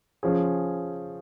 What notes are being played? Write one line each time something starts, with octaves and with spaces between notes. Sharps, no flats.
F3 C#4 G#4